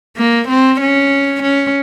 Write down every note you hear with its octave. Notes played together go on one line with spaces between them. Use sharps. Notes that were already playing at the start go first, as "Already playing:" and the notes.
A#3
C4
C#4
C#4